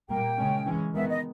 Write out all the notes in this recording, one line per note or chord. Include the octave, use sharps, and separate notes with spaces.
A#2 G3 A#3 G5
C#3 G#3 C#4
E3 G#3 C#4
D#3 G#3 B3 E5
D#5